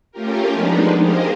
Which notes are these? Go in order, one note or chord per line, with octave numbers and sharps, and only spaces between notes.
A3 C#4 F4 G4 A#4
F3 G#3 B3 D4 D#4
G4 G#4 A#4 C5 D#5 F5